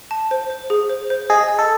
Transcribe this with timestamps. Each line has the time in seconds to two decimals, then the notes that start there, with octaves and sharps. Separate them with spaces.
0.11 A5
0.31 C5
0.50 C5
0.70 G#4
0.89 C5
1.10 C5
1.30 G#4 D#5
1.49 D#5
1.59 A4